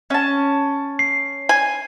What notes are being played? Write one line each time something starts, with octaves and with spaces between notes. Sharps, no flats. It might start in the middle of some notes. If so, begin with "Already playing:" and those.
C#4 A5
C7
G#5